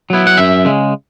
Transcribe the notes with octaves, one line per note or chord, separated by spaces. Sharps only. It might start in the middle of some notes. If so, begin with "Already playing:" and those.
F#3 B3 E4
F#5
F#2 E5
C#3 G#3